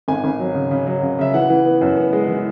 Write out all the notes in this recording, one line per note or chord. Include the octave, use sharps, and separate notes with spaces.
G#1 G#5
G#1
F#3
C#3
C#3
F#3
C#3
C#3 E5
E3 F#5
E3
B3
F#2
B3
G#3
E3